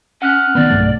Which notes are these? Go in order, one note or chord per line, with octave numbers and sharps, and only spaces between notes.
C#4 F#5 F6 F#6
D#3 B3 D5
B1 G2 A3